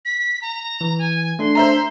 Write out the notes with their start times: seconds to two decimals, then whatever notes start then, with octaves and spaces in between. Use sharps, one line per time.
0.05 B6
0.42 A#5
0.81 E3
0.99 G#5
1.39 A3 D4 C6
1.55 C5 E5 A#5